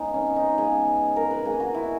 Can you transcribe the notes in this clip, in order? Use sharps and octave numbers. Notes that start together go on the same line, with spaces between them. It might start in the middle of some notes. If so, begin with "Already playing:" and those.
Already playing: C#3 G#3 B3 D#4
C#4
D#4
C#3 G#3 B3 G#4
A#4
B4
D#3 A#3 G#4
F#4
E4